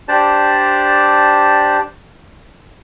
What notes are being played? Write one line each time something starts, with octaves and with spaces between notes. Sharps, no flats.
D4 G4 C5 D5 A5